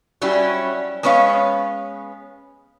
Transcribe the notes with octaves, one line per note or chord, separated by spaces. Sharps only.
F#3 G3 C#4 E4
G#3 B3 C#4 B4 C#5 F5